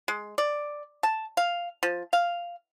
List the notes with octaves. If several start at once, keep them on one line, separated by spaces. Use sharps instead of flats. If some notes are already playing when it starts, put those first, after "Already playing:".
G#3
D5
A5
F5
F3
F5